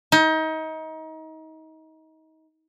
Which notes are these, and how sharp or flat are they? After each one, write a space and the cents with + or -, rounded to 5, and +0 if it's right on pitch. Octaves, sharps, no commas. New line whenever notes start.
D#4 +30